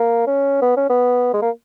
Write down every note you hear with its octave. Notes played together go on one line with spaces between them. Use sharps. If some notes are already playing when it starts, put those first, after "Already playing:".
Already playing: A#3
C#4
B3
C#4
B3
G#3
A#3